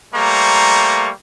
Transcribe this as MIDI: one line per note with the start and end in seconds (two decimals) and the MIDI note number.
0.15 1.10 55
0.15 1.10 57
0.15 1.10 58
0.15 1.10 72
0.15 1.10 82
0.15 1.10 85